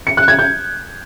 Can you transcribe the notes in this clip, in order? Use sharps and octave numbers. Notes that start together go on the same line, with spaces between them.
C#7
F#6
G#6
G6